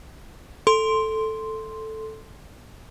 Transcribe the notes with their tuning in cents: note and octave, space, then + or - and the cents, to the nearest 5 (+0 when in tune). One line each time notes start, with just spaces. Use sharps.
A4 +0 C6 +0